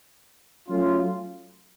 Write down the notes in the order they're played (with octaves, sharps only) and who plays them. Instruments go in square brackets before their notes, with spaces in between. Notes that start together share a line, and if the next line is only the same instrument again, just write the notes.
[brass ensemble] F#3 A3 C#4 F4